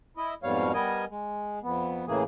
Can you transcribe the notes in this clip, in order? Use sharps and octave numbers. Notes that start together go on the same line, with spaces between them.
E4 D#5
F2 G#2 B2 G3 C#5 F5
G3 B3 A#4 D#5 G#5
G#3
F2 B3
A2 C#3 E3 A#3 G#4